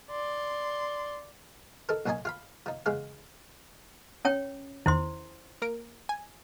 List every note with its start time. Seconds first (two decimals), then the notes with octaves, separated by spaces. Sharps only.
0.11 D5 C6
1.89 D#4 A4 A#4
2.06 B1 A#2 C#4 D#4 D#5 G#5
2.25 F4 F5 B5
2.66 F3 D#4
2.86 E2 C#3 G#3 F5
4.25 C#4 C#5 G5
4.86 E2 D#3 E4 C5 C6
5.62 A#3 A#4 D7
6.09 G#5